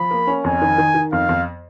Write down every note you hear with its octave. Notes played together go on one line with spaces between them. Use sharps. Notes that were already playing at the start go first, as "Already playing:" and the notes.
Already playing: F3 B5
A#3
C#4
F2 G#5
D#3
D#3
D#3
F2 F5
F2